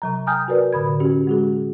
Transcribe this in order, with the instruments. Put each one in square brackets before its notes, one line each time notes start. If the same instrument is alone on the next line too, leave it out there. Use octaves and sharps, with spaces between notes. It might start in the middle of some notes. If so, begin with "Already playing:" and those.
[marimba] C3 F#3 A#5
G5 G#5 A#5 D#6 F6 G6
F#4 A#4 B4 D5
A2 D3 B5 G#6
C#4 F#4 G4
G#3 F#4 G#4